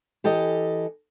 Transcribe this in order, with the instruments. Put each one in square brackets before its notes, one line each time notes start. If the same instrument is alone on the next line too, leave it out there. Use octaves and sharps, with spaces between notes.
[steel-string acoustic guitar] E3 G4 A4 D#5